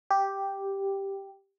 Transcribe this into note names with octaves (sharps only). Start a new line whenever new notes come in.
G4